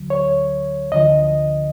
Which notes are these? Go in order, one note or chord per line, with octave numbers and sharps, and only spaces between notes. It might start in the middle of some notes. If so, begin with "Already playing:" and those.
Already playing: D2 D3 F#3
C#5
D2 D3 F3 D#5